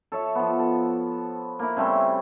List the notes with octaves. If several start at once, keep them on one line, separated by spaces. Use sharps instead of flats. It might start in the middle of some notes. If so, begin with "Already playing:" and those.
A4 C#5 E5
F3 B3
A4
A#3 E4
C#3 G3 A3 C4